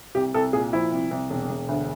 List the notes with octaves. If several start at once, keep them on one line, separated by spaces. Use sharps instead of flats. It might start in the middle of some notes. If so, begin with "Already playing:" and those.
C2 G4
C2 A4
A#2 G#4
F3 E4
C2
C2
E1
E1
D2